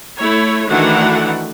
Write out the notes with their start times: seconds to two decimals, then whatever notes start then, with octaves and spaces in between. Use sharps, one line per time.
0.16 A3 E4 C#5
0.68 D#3 E3 A3 D4 F#4 F#5